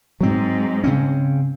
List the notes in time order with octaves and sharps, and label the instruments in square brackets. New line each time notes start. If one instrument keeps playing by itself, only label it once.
[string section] G#2 [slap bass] F#3 C4
[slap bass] C#3 C4 C#4